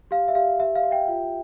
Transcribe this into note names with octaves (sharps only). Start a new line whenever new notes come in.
G4 F5
E5
G4 F5
G4 E5
F5
G4
E5 G5
F4